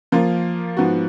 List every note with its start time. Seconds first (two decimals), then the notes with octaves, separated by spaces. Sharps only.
0.12 F3 A#3 F4 A#4
0.77 G#2 F3 B3 F#4